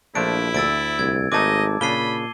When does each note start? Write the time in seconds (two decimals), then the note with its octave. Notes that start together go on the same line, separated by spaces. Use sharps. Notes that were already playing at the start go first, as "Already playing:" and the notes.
0.15 A#1 F3 A3 D4 E4 D7
0.55 D2 E6 A6 D7
0.99 C2 G#6
1.32 G#1 G#3 A3 D#4 D#5 A5 D6
1.81 A#2 C#3 D4 B5 C7 D#7 G7